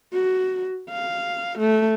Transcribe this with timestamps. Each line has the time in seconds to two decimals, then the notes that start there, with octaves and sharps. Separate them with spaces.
0.13 F#4
0.90 F5
1.59 A3